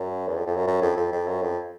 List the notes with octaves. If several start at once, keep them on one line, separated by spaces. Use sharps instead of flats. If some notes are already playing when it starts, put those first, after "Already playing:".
Already playing: F#2
E2
F2
F2
F#2
F#2
F2
F2
F2
F#2
F2